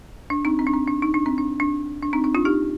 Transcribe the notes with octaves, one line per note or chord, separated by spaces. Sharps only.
D4
C4 D#4
C4
D4
C4
D4
D#4
D4
C4
D4
D4
D4
C4 D#4
C4 D#4
D4 F4
D#4 G4